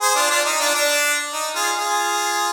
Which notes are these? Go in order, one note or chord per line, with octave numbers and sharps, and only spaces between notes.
G#4 C5
D4 F4
D4 F4
D#4
D4 F4
D4
D#4
F4 G#4
F4 G#4